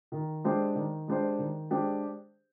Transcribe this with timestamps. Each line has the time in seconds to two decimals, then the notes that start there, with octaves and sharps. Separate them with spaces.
0.12 D#3
0.44 G#3 D4 G4 C5
0.75 D#3
1.08 G#3 D4 G4 C5
1.39 D#3
1.70 G#3 D4 G4 C5